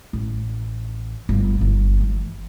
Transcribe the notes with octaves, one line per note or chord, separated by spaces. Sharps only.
A1
G1
G1
E3